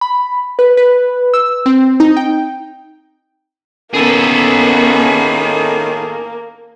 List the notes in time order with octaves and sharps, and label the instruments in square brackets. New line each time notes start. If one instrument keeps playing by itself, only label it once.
[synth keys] B5
B4
B4
E6
C4
D#4
G5
[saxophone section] A2 D#3 [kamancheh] A#3 [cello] B3 C#4 [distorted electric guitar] G#4 A4